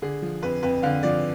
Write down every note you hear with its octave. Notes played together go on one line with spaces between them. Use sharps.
D3 G#4
F3
F2 B4
F2 B4
D3 F5
F3 D5